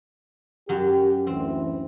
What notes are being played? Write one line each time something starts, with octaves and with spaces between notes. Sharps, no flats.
F#2 F#3 G4
D2 E3 C4